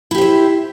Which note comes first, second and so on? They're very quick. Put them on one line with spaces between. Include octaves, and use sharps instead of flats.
E4 G4 C5 E5